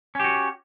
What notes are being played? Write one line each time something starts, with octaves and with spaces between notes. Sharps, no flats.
C#4 F#4 G4